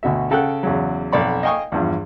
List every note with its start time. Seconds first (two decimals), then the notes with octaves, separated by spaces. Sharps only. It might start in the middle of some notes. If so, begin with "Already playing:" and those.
0.03 D2 B2 F#4 E5
0.31 C#3 A4 F#5 G5 A5 F#6
0.63 E2 C#3 F#3
1.12 B1 F2 D5 F#5 B5
1.43 D#5 F5 G5 G#5 C#6 D#6
1.72 E2 G2 F3